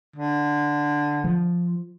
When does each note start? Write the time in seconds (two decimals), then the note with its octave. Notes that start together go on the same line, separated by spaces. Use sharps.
0.16 D3
1.24 F3